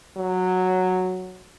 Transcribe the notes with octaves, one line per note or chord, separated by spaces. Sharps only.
F#3